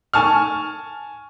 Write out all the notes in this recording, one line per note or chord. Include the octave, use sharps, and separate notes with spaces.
G#5 A5 C#6 F6